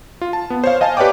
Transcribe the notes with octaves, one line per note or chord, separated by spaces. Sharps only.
F4
A5
B3
C5 C#5 F5
D#5 F5 G#5 A5
G4 B4 C#5 D5 G5 D6